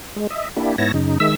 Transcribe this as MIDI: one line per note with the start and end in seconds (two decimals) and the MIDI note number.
0.16 0.27 56
0.30 0.49 75
0.30 0.49 76
0.56 0.76 58
0.56 0.76 62
0.56 0.76 64
0.56 0.76 67
0.78 0.92 44
0.78 0.92 59
0.78 0.92 64
0.78 0.92 73
0.78 0.92 81
0.78 0.92 94
0.94 1.18 42
0.94 1.18 49
0.94 1.18 63
1.20 1.35 51
1.20 1.35 56
1.20 1.35 76
1.20 1.35 88